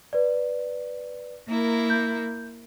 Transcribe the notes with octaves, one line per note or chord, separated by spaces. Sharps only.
B4 D5
A#3 E4 A#4
G6